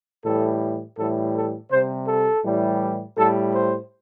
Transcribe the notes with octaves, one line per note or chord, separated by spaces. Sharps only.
A2 E3 G3 A4
A2 E3 G3 A4
A4
C3 G3 C5
A4
A2 E3 G3
A2 G3 A4
C5